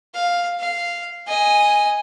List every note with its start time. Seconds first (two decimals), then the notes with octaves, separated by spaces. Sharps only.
0.14 F5
0.59 F5
1.28 D#5 G#5